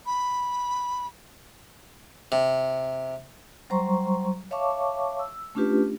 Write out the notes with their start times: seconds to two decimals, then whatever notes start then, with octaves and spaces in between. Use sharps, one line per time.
0.06 B5
2.32 C3
3.70 F#3 G3 C5 A#5 C6 C#6
4.51 C#5 E5 F5 A5 C#6 D6
5.19 E6
5.55 A3 C#4 D4 F4 G4 B4